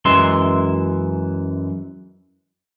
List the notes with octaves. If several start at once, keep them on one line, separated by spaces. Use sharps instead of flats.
F#2 E3 G#3 E5 C6